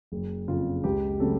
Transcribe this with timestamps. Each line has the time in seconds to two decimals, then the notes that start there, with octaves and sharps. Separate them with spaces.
0.12 F#1
0.48 F2 C#3 F4
0.84 C#2 G4
1.20 C#3 F#3 A3 C#4 A4